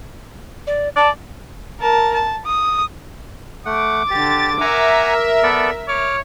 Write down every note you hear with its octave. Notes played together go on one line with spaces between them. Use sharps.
D5
D5 A5
A#4 A5
A5
D#6
A3 F#5 D6
D3 G4 A6
A#4 E5 F#5 G#5 A#5
B3 A4 D5
C#5 D6 F6